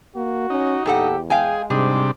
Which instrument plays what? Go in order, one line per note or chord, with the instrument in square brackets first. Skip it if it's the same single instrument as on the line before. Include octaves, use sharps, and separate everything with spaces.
[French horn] A#3 [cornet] F#4
[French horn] C#4 [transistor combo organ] D#4
[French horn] E2 [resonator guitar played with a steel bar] A#2 A4 F#5 [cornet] G4
[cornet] G#3 [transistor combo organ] G#4 [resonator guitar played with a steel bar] F5 G5 G#5
[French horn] G#2 [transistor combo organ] C3 G3 D4 [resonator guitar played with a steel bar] G#4